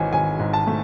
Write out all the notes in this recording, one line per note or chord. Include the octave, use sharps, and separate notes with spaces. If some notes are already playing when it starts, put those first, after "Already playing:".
Already playing: G#1 E3 C#5 D#5 G#5
G#1 G#5
G#2
A5
A3